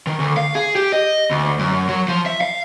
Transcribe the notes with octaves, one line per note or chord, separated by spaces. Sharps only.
D#3
D2
F5
G#4
G4
D#5
D2
F#2
F#3
F3
E5
F5